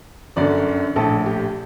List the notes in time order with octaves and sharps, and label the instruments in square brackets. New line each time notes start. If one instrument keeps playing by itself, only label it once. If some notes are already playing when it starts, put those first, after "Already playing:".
[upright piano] G1 F#2 D3 D5
A#1 A2 A4
G4